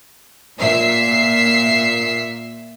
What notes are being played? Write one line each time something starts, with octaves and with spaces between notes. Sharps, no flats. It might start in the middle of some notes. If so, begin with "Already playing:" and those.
A#2 E5 C7